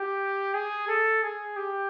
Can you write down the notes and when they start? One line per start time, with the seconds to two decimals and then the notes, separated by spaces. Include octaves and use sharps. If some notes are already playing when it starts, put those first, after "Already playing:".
Already playing: G4
0.54 G#4
0.88 A4
1.22 G#4
1.56 G4